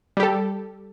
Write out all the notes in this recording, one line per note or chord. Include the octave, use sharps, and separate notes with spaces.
G3 G4 A4